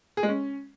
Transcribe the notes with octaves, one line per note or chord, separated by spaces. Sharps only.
G#4
G#3
C#4